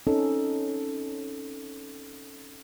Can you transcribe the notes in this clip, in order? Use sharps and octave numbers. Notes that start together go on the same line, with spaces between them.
C4 C#4 D#4 A4